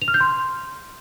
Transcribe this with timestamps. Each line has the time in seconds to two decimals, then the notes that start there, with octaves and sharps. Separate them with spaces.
0.02 F7
0.08 F6
0.14 G6
0.20 C6